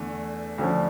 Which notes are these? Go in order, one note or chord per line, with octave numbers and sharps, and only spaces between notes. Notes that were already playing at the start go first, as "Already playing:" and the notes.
Already playing: E2 D3 A3
D2 D3 F3 C#4